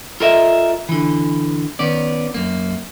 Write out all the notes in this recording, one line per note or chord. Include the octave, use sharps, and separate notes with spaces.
F4 A4 A#4 D#5 E5
D3 E3
D#3 B3 C#4 D5
F#2 A#3